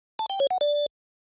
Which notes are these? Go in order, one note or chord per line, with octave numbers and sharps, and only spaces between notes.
A5
G5
C#5
F#5
D5